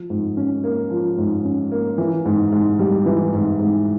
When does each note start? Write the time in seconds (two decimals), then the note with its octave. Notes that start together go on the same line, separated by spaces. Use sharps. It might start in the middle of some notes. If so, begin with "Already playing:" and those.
Already playing: F3
0.10 G#2
0.37 C#4
0.64 A#3
0.90 F3
1.18 G#2
1.45 C#4
1.72 A#3
1.98 E3
2.25 G#2
2.52 G#2
2.79 G3
3.06 E3
3.34 G#2
3.60 G#2